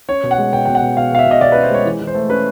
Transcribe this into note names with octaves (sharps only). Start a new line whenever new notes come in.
C#4 C#5
B2
F#5
G#3
B2 G5
B2 G5
F#5
B2
B2 F5
B2 F5
E5
B2 D#5
B2 D5
C#4 B4
C5
G#3 C#5
E3
E3
C5
A3
C#4 B4